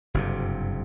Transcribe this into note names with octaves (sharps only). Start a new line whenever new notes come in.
F#1 G2 C3